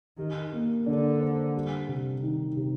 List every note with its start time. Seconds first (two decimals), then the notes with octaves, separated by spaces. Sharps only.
0.18 D#3 G4
0.52 A#3
0.86 D3 D4
1.20 C5
1.55 G3
1.88 C3
2.23 D#3
2.56 C3